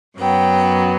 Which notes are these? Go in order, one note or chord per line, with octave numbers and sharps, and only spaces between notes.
F#2 F#3 B3 G5